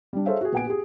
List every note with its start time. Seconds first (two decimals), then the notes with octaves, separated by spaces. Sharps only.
0.13 G3 D4
0.26 G#4 A4 C5 C#5 E5 F5
0.41 F#4 G#4
0.52 A#1 B3 F#5 G#5 D7
0.67 G4 G#4